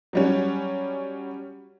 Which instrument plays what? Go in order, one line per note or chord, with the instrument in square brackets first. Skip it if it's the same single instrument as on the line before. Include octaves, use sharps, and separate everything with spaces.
[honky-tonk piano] F#3 G3 C#4